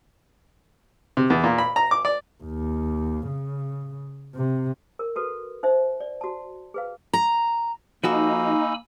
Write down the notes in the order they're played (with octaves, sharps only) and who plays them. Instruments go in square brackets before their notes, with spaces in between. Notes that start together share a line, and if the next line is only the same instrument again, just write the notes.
[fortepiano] C3
E2
A#2
B5
A#5
D6
D5
[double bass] D#2
C#3
C3
[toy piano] A#4
F#4 A4 B4
D#4 C5 E5
D5
F#4 A5
G#4 B4 F5
[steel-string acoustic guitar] A#5
[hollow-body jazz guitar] F3 F#4 A4 [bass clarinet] A#3 [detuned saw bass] D#4 [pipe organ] G#5 B5 E6